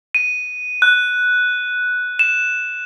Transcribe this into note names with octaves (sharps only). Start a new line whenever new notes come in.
D#7
F#6
E7